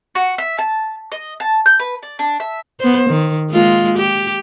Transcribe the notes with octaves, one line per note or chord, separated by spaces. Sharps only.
F#4
E5
A5
D#5
A5
G6
B4
D5
D4
E5
B3 C5
D#3
G#3 A#3 F4
G4